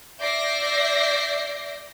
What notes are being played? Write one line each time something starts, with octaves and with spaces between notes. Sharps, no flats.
D5 E5 D6 G6 A#6 C7